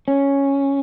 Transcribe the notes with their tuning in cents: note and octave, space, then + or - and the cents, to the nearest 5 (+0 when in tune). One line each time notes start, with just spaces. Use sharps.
C#4 +0